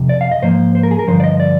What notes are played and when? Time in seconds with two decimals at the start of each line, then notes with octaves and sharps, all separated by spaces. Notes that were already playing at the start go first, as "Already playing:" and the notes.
Already playing: F2 C3
0.09 D5
0.21 F5
0.31 D#5
0.42 G#2 F3 A#3 C5
0.75 C5
0.83 A#4
0.91 G#4
0.99 A#4
1.07 G2 D3 F3 C5
1.20 D5
1.24 D#5
1.40 D5